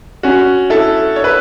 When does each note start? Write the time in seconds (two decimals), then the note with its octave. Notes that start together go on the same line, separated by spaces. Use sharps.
0.23 C#4 F#4
0.70 E4 A4
1.16 C#5
1.24 B4